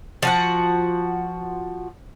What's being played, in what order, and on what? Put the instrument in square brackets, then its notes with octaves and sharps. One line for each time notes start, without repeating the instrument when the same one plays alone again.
[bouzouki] F3 F#4 F#5